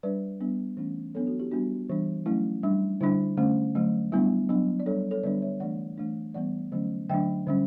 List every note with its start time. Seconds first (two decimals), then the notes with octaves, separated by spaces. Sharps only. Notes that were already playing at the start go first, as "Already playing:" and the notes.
0.03 G3 D4 B4 D5
0.41 G3 B3 D4
0.77 E3 A3 C#4
1.15 F#3 B3 D4 A4 C#5
1.27 F#4 A4
1.39 E4 G4
1.51 G3 B3 D4 F#4
1.89 E3 G3 D4
2.26 F#3 A3 C#4 E4
2.63 G3 D4
3.01 D3 G3 D4 E4
3.37 D3 A3 C#4
3.75 D3 F#3 A3
4.12 G3 B3 D4 E4
4.49 F#3 B3 D4
4.80 D5
4.86 G3 D4 A4 C#5
5.11 A4 C#5
5.23 D3 G3 B3 D4 B4 D5
5.42 C#5 E5
5.60 E3 A3 D4 D5 F#5
5.98 E3 A3 D4
6.34 E3 G3 B3 D5 F#5
6.72 D3 F#3 A3 C#4
7.09 D3 F#3 A3 D4 E5 G5
7.47 D3 G3 C#4